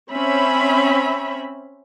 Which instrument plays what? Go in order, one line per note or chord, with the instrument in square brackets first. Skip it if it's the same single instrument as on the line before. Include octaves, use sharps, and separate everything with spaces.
[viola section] C4 C#4 E5 B5